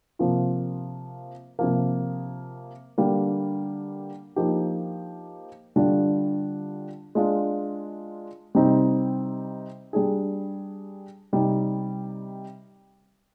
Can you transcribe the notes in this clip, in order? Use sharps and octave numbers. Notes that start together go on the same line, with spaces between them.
C3 F3 A#3 F4
C3 F3 A#3
D3 G3 A#3 D4
F3 A#3 D#4 G4
D3 G3 D4 F4
G#3 D4 F4
C3 G3 C4 D#4
G3 D4 G#4
C3 G3 C4 D#4